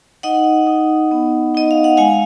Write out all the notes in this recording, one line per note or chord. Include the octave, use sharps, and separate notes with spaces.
D#4 D#5 F#5
D#4
B3
D#4 D#5
F5
F#5
G#3 F5 G#5